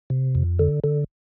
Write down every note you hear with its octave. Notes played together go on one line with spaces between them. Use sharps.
C3
F2
D3
D3